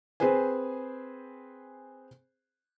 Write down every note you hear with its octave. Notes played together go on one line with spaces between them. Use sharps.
C4 G#4 B4 C5 G#5